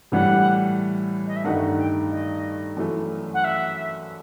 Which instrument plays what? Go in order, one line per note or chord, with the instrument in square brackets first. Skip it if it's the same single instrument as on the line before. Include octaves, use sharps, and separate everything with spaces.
[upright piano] A2 E3 G3 [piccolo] F#5
[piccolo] D#5
E5
[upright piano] G2 D#3 A3 D#4 [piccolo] F#5
[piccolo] G5
D#5
[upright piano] F#2 E3 A3
[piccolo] F#5
E5